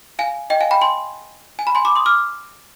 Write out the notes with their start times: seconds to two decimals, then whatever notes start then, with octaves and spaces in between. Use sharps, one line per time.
0.19 F5 G#5
0.50 D#5 G5
0.60 F5 G#5
0.71 G5 B5
0.81 G#5 C6
1.59 G#5
1.67 B5
1.75 G#5 C6
1.85 B5 D6
1.96 C6 D#6
2.06 D6 F6